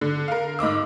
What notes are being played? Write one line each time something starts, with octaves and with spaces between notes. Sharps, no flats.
D3
A#4 F5
G#2 D#5 D6 E6